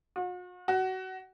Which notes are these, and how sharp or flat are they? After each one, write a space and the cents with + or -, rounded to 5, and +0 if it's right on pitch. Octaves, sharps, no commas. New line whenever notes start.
F#4 -45
F#4 +20